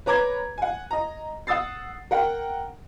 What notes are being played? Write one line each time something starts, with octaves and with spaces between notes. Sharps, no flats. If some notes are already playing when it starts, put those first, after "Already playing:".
B4 C#5 A#5 D6 G#6
F#5 G#5
D#5 A#5
F#5 D#6 E6 A6 C7
A#4 F#5 G5